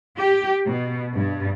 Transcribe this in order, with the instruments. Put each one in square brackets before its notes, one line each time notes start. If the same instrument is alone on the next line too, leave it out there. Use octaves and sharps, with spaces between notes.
[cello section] G4
B2
G2